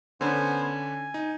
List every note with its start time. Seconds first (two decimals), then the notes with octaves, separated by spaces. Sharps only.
0.21 D3 B3 C#4 D4 C5 G#5
0.63 G#5
1.14 D#4